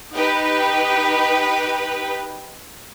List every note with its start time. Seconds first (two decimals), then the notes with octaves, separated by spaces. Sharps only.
0.14 D#4 G4 B4